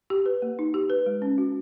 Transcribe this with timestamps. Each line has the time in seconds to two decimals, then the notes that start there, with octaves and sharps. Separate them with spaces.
0.10 G4
0.26 B4
0.42 A#3
0.59 D#4
0.74 G4
0.90 B4
1.06 G#3
1.22 C#4
1.38 F#4